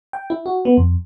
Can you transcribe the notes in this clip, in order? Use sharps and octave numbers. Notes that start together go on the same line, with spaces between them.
G5
E4
F#4
B3
F2